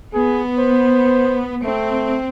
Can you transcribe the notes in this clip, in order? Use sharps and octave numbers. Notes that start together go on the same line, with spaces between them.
B3 G#4
C5
A3 C4